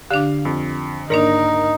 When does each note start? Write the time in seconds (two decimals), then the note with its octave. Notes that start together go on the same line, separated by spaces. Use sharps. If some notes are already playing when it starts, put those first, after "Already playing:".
0.11 D3 D4 G4 F5 D6
0.45 F2
1.10 G#2 D#3 A#3 D4 D#4 A#4